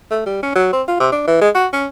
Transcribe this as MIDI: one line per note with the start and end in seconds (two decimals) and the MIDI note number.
0.11 0.22 57
0.26 0.39 55
0.43 0.53 61
0.55 0.71 54
0.73 0.82 60
0.88 0.95 65
1.00 1.09 48
1.12 1.24 62
1.27 1.39 52
1.41 1.50 56
1.55 1.67 66
1.73 1.87 61